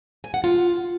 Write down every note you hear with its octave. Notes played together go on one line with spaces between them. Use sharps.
G#5
F#5
F4